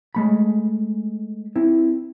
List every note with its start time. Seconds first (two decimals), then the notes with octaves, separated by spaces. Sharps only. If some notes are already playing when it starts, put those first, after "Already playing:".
0.15 G#3 A3 B5
1.56 C4 E4